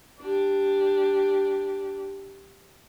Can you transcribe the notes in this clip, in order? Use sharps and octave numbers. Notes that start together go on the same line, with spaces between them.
D4 G4